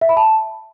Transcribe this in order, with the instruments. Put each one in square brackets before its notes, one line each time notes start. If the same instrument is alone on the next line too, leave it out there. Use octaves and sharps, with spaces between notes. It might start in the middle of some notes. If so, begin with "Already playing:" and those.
[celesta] E5
B5
A5